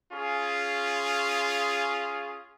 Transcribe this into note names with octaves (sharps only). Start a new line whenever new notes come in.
C#4 F4 G#4